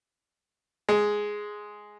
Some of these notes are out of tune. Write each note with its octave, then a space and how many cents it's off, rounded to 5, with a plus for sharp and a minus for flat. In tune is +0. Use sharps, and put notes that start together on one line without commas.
G#3 +0